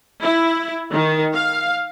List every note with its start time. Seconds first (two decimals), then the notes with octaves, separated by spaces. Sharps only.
0.22 E4
0.91 D#3
1.34 F5